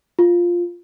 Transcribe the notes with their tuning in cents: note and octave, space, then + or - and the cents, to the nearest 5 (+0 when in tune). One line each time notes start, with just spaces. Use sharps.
F4 +0